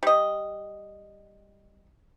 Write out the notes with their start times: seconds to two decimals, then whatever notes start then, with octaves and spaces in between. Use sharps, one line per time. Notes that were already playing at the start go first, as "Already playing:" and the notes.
0.03 G3 D#5